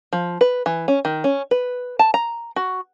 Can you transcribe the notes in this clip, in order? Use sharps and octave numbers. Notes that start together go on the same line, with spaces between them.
F3
B4
E3
C#4
D#3
C#4
B4
A5
A#5
F#4